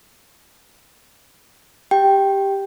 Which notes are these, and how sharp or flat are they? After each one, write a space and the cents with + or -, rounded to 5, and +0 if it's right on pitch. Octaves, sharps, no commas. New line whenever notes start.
G4 +0 G5 +0